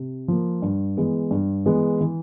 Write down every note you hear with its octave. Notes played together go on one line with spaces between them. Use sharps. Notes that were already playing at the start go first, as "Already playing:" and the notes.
Already playing: C3
F3 A#3
G2
E3 G#3 B3
G2
E3 G#3 B3
E3